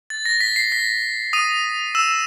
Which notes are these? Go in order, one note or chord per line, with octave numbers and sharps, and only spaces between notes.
A6
A#6
B6
C7
B6
D#6 D#7
E6 E7